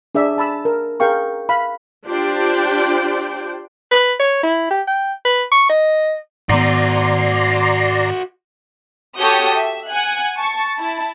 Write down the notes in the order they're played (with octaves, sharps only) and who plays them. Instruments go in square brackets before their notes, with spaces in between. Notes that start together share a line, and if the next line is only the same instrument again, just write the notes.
[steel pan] D4 G#4 D5 E5
G#5 A5 B5 E6
A#4
G#4 A#4 F5 G5 C#6
F5 B5
[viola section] D4 F4 G4 C5 D5 G5
[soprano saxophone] B4
C#5
E4
G4
G5
B4
C#6
D#5
[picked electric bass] G#2 D#3 B3 [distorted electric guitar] F#4 C5 [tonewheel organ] D5 A#5 C6
[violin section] F#4 G4 A4 C#5 D#6 G6
E5
F#5 G#5 F#6
A5 C#6 A6 C#7
E4 A5